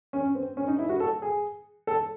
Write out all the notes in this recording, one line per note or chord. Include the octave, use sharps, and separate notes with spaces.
C#4
C4
C#4
D#4
E4
F#4
A4
G#4
A4